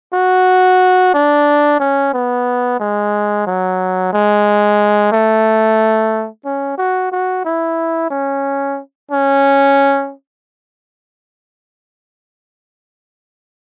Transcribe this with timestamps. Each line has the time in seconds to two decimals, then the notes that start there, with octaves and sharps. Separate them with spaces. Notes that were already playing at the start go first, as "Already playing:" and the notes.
0.13 F#4
1.14 D4
1.80 C#4
2.14 B3
2.80 G#3
3.47 F#3
4.13 G#3
5.12 A3
6.45 C#4
6.78 F#4
7.12 F#4
7.45 E4
8.11 C#4
9.11 C#4